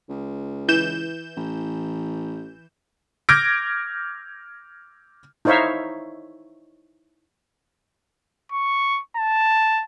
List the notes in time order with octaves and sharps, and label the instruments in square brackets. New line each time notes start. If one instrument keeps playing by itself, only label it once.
[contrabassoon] C#2
[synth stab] E3 G6 E7
[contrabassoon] A1
[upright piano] D6 F6 G6 G#6 A#6 D7
[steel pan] D#4 E4 C5 C#5 E5 F5
[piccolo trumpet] C#6
A5